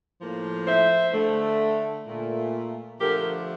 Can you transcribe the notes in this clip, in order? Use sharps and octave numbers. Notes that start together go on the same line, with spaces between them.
A2 F3 A#3
C5 E5
D3 A3
A#2 A3
D3 F3 A3 G4 A#4